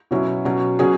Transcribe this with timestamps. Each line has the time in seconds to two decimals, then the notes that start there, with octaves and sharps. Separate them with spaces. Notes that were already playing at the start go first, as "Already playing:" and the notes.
0.11 B2 F#3 C#4 E4
0.45 B2 F#3 C#4
0.79 B2 F#3 C#4 G#4